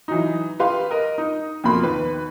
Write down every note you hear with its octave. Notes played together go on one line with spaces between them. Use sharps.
E3 F#3 D#4
G4 B4 F5 C6
A#4 D#5
D#4
F2 B2 A#3 B5 C6
D#2 B4